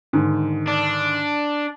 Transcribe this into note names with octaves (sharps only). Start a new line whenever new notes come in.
G#2 D3 D#3
D4